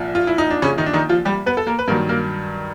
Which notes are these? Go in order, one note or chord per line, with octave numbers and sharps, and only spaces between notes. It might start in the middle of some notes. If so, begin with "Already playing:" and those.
Already playing: C2 A#2 F3
F4
E4
D#4
D4
C#3 C#4
D#3 D#4
D4
D#3 D#4
F3 F4
G3 G4
B3 B4
A4
A#3 A#4
B4
G2 D#3 F#3 A#3 A#4
A#3 A#4